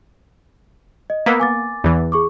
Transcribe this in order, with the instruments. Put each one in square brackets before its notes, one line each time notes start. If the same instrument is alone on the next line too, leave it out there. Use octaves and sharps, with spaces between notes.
[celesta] D#5
[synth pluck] A#3 B3 [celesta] E6 B6
[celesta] G#5 D6 A6
[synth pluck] E2 E3
[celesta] G#4 C#6 D6